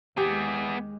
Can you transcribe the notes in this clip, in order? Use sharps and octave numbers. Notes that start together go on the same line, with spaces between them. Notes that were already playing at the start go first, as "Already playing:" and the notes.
D#2 G#3 B3 G4 G#4